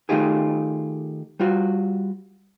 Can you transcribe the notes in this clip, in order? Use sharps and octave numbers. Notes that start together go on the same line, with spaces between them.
D#3 A3 D#4 F4 G4 G#4
G3 F4 F#4